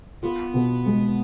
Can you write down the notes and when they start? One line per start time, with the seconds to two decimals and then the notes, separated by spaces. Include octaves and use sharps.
0.23 B3 F4
0.54 B2
0.86 G#3